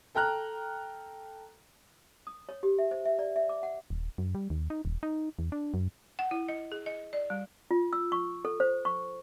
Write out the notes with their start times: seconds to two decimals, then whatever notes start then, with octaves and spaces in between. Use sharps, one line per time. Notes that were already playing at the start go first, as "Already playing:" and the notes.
0.15 A4 G5 A#5 F6 F#6
2.27 D#6
2.49 C#5
2.63 G4
2.79 E5
2.91 C5
3.05 E5
3.19 D5
3.36 E5
3.49 D6
3.63 F#5
3.90 D#1
4.18 F#2
4.35 G3
4.50 D#2
4.70 D#4
4.85 D#1
5.03 D#4
5.39 E2
5.52 D4
5.74 F#2
6.19 F#5
6.31 E4
6.48 D#5
6.72 G#4
6.86 D#5
7.13 D5
7.30 G3
7.71 F4
7.93 E6
8.12 C#6
8.45 A4
8.60 C5
8.85 C#6